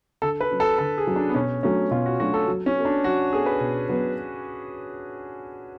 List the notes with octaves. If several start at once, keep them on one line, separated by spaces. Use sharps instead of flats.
D3 A4
B4
F#3 C#4
A4
D3 A4
G#4
F#3 C#4
D4
B3
B2 C#4
F#3 A3 C#4 D4
B2 F4
F#4
F#3 A3 D4 F#4
A4
F#3
C#4
B3 F#4 A4
D4
F#3 F#4
B3 F#4 G#4 A4
B4
B2
F#3 B3 F#4 B4